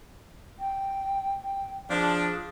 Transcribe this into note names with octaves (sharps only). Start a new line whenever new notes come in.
G5
G5
F3 D4 G#4